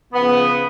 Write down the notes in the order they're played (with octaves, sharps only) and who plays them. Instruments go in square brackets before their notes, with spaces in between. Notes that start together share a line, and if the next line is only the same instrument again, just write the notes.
[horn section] C#3 F3 B3